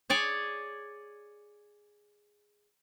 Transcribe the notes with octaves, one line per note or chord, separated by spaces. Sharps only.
G#4 C#5 D5 G#5